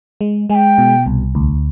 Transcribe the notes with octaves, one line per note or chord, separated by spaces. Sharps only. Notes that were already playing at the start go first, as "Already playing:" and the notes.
G#3
G#3 G#5
G5
B2
C2
D2